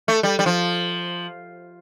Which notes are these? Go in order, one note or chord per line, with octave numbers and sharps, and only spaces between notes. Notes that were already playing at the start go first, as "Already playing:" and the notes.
A3
G3
G3
F3